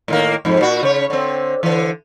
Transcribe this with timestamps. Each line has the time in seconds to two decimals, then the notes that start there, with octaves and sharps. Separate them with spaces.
0.08 A2 D#3 A#3
0.45 F2 G#2
0.61 A#2 F#4
0.83 C#3 C#5
1.10 D3 C4
1.63 D3 E3